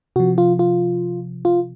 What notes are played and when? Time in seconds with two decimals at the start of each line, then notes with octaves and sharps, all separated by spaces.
0.16 C3 F3 F#4
0.38 F4
0.59 F4
1.45 F4